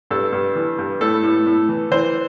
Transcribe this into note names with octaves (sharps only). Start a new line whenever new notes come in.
G2 A4
G2
E3
G2
A2 A4
A2
A2
E3
E3 C5